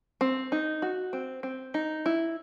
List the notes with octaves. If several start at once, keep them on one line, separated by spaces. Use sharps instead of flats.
C4
D#4
F#4
C4
C4
D#4
E4